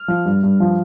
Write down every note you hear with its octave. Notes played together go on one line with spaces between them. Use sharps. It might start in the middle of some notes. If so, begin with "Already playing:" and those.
Already playing: F6
F3
G2
G2
F3